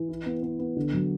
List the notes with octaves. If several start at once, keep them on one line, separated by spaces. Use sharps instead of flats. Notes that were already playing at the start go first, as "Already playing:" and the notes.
Already playing: E3
E4
B3
B3
B3
D3
F#3